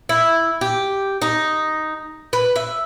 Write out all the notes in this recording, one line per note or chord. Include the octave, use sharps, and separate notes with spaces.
E4
G4
D#4
B4
E5